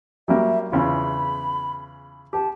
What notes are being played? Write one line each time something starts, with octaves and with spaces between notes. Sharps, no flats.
F#3 G3 A#3 E5
E2 C#3 F4 B5
G4 A5